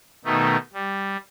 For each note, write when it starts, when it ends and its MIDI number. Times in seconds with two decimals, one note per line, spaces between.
0.25 0.57 47
0.25 0.57 51
0.25 0.57 57
0.25 0.57 63
0.74 1.17 55